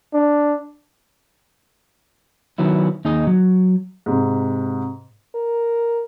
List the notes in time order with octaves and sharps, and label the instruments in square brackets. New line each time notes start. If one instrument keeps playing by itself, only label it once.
[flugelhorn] D4
[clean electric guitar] D#3 F#3 B3 E4
D#2 D#4 G#4 D#5
F#3
[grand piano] G#2 C3
[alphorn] A#4